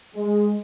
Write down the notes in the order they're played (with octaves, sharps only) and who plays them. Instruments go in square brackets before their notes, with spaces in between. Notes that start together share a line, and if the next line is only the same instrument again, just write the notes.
[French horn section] G#3